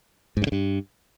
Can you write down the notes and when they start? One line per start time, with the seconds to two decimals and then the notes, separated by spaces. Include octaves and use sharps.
0.37 G#2
0.42 G2
0.47 C#3
0.52 G2